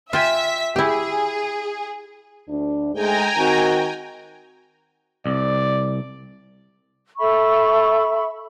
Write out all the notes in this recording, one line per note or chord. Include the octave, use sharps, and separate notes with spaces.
F4 E5 G5 G#5 B6
E4 G4 G#4
D2 D4
G#2 G#3 A3 G#4 G5 G#5 A#5
D#3 C4 F#4
C2 D5
A4 E5 B5 C#6